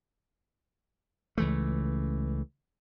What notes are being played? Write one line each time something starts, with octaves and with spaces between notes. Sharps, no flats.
C#2 E3 A3